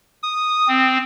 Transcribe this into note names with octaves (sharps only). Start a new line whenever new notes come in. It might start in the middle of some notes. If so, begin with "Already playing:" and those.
D#6
C4